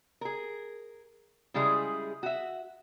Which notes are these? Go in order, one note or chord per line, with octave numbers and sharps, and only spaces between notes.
G#4 A#4
C#3 G3 G#3 E4 G#4
F#4 E5